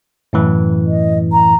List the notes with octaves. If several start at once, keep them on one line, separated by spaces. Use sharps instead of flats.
F#2 A2 E3
D#5
A#5